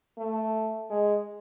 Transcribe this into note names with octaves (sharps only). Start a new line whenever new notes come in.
A3
G#3